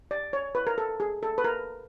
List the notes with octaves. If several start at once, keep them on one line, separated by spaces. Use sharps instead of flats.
D5
C#5
B4
A#4
A4
G#4
A4
B4
A#4